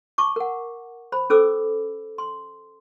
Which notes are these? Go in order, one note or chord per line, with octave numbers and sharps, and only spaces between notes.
A5 C#6 D6
A#4 F#5
C5 B5
C#4 A4 C5 D6 E6
C6